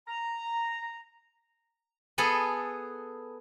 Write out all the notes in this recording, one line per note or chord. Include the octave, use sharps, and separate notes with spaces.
A#5
B3 G#4 A4 B4